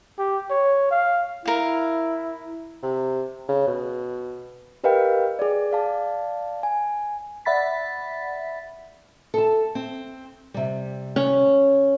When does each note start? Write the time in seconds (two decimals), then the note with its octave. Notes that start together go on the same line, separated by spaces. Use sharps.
0.18 G4
0.50 C#5
0.91 F5
1.46 E4 A#4 F5
2.83 C3
3.48 C#3
3.67 B2
4.84 G4 A#4 B4 D#5 F5 G5
5.39 G#4 D5
5.71 D5 F5 A5
6.63 G#5
7.45 D5 E5 F#5 B5 A6 B6
9.34 A4 A5
9.75 C4
10.54 C3 G3
11.16 C#4